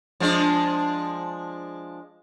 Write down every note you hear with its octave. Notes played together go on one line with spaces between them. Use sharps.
F3 G#3 D4